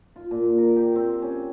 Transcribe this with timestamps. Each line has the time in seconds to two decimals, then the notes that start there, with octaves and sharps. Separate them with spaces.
0.16 F4
0.31 A#2
0.58 A#4
0.76 G4
0.96 C4
1.22 C#4